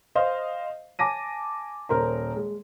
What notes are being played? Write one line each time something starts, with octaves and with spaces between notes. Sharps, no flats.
C5 D#5 F5
G#5 A5 D6 A#6 D#7
D#1 A#4 C5 A#5
G#3